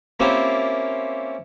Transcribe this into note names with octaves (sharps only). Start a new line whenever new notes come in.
A#3 C4 C#4 E4 F4 G4